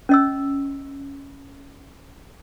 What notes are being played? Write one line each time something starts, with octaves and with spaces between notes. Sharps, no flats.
C#4 D#5 E6